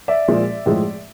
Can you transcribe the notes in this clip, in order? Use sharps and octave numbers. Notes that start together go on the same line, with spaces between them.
D5 E5
A#2 F3 G#3
A2 F3 G#3